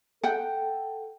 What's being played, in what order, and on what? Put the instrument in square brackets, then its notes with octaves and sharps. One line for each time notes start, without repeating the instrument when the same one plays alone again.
[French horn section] A4 [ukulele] F#5 G5